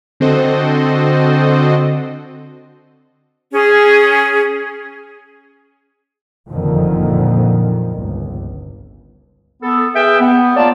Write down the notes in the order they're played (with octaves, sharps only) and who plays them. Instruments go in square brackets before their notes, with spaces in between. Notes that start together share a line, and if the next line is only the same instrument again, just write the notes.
[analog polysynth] D3 C4 F#4 A4 C5 D#5
[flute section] C#4 G#4
[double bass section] F#1 F2 A#2 D3 D#3 F3
G1 C#2
[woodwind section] B3 A4
G#4 B4 E5 G5
B3
A#3 F4 C#5 D5 A5